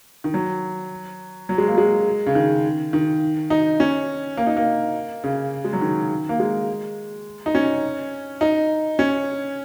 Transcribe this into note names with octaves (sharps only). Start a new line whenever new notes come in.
D#3
F#3
F#3
G#3
A#3
G#3
C#3
D#3
D#3
D#4
C#4
A#3
D#4
A#3
C#3
G#3
F#3
D#3
A#3
G#3
D#4
C#4
D#4
C#4